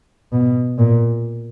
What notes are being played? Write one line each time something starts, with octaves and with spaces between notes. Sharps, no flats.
B2
A#2